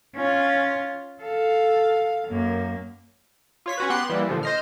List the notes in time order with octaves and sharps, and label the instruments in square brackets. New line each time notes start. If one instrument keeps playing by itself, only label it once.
[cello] C#4 F4
A4 F5
F#2 A#3
[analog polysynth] F4 C#5 B6
C#4 F#4 B4
B3 G4 C6 F#6
E3 G3 A#3
A#2 D3 F3
C5 D#5 F6